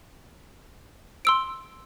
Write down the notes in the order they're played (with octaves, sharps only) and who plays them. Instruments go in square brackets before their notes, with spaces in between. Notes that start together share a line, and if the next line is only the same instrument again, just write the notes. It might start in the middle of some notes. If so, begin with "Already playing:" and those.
[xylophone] C6 E6 D7